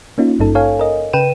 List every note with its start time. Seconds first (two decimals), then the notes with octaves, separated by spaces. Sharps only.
0.18 A#3 C#4 D#4 F4
0.39 G#1 G2 D#4 A4
0.55 A4 C#5 F5 G#5
0.79 A#4 D#5
1.13 C#3 B4 G5 D#7 E7